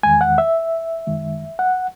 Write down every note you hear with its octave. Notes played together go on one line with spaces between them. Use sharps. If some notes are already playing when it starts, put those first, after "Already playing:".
E2 D#3 G#3 G#5
F#5
E5
F#2 D#3 G#3
F#5